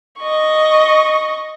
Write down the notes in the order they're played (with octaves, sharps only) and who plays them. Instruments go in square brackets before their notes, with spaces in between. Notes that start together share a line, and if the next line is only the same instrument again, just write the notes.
[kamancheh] D#5 C#6